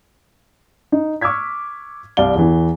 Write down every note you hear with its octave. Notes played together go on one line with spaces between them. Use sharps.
D#4
C#6 D6 E6 F6 G#6 B6
C2 D5 F5 G7
E2 E3